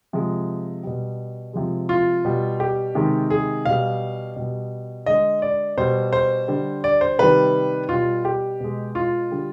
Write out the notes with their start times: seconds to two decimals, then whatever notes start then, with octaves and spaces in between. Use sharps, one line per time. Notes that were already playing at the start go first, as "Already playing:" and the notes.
0.13 C3 F3 G#3
0.83 B2 G3
1.53 C3 F3 G#3
1.89 F4
2.25 B2 G3
2.60 G4
2.95 C3 D#3 G#3
3.30 G#4
3.65 B2 G3 F5
4.36 B2 G3
5.06 D3 G#3 D#5
5.42 D5
5.78 B2 G3 C5
6.13 C5
6.48 D3 G3
6.84 D5
7.01 C5
7.19 C3 D#3 G3 B4
7.89 B2 G3 F4
8.25 G4
8.60 B2 G#3
8.95 F4
9.31 D3 G3